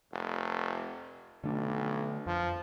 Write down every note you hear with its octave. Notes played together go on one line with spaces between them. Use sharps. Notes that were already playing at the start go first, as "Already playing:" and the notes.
F1
B1 D3 A3 D4
F2 F3